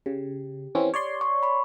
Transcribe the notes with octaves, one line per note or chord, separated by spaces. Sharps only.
C#3 G4
E3 C4 C#4
C#5 D5 C6
C#6
B5 C#6